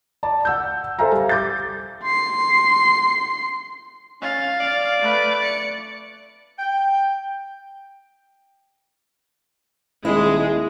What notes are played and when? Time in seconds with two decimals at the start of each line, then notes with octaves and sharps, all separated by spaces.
0.23 D5 A5
0.45 F#5 E6 G6
0.99 A4 C5 E5 F5 G#5 A#5
1.12 G3
1.29 D6 G6 A6
2.04 C6 C7
4.22 C#4 F5 A6
4.60 D5
5.01 A3 B4
5.44 C#7
6.59 G5
10.05 D#1 G#3 E4